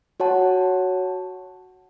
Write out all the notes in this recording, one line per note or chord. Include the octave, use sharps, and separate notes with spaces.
F#4 C#5 F#5 A5